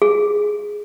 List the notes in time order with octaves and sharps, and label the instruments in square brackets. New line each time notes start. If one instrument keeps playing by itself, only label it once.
[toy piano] G#4